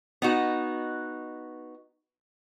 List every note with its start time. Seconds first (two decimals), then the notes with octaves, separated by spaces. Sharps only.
0.22 B3 D#4 F#4